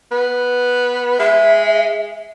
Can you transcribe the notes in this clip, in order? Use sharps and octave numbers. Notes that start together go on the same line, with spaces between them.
B3
G#3 E5